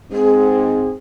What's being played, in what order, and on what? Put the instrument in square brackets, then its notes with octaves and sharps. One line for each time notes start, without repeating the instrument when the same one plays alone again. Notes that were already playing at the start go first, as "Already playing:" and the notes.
[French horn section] G#2 C4 [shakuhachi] G#4